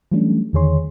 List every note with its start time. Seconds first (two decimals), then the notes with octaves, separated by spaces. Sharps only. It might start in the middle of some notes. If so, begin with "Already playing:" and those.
0.12 E3 F#3 G3 A3 C#4 D4
0.53 E2 D3 D#3 G#4 C#5 C6